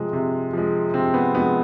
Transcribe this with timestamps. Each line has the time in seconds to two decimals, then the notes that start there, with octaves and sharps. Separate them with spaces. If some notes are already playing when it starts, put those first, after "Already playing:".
Already playing: C3 F3 G#3
0.13 C3
0.53 F3 G#3
0.94 C3 C4
1.14 B3
1.35 F3 G#3 B3